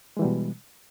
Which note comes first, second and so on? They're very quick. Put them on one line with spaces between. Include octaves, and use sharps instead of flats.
G#3 E3 G3 B2